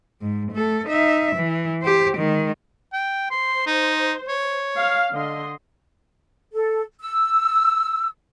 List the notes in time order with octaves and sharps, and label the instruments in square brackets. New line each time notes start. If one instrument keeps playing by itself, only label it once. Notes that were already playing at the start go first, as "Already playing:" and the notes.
[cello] G#2
A3 A4
D#4 E5
E3
G4 C5
D#3 G#3
[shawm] G5
[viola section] C5 [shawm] C6
[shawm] D#4
C#5
[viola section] F5
D3 D#5 C6
[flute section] A4
E6